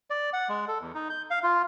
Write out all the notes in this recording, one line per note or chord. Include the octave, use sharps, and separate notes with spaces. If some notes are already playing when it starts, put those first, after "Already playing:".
D5
F#5
G#3
A4
E2
D#4
G6
F5
F4